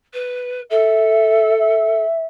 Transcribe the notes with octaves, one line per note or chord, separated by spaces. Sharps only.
B4
A4 E5
E5